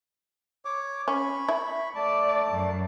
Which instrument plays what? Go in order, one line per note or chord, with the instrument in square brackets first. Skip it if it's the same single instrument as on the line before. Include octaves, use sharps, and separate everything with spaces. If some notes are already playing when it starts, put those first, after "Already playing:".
[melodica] C#5 D6
[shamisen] C#4 [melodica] B5 C#6
[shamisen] E4
[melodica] A3 A5 [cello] D5
[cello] F#2